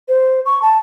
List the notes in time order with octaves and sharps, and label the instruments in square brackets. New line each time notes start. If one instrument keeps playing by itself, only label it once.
[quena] C5
C#6
A5